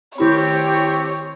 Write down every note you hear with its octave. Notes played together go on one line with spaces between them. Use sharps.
D#3 C4 E4 G4 C#5 B5